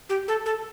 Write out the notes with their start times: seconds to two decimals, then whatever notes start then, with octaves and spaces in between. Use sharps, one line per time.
0.09 G4
0.28 A4
0.46 A4